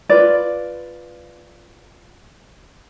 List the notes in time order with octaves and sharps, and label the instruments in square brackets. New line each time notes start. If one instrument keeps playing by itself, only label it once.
[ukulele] F4 B4 D5